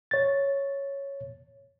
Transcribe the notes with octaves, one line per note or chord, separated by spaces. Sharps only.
C#5 A6